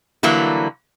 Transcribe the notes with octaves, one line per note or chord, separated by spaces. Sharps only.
D3 E3 F#3 G3 A#3 E4